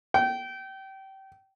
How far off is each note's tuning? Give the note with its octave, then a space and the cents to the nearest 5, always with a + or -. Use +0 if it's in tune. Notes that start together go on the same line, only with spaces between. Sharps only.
G5 -25